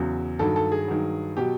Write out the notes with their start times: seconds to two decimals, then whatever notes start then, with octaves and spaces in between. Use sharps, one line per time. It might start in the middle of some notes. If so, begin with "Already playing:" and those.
Already playing: E2 C#3 F#3
0.39 G2 D#3 F#3 A4
0.56 A4
0.72 G#4
0.88 G2 D#3 F#3
1.37 B2 F#3 G4